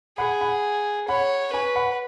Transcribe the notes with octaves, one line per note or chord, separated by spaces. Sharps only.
G#4 F#5 B5
F#5 B5
C#5 F#5 B5
B4 G#5 C#6
F#5 B5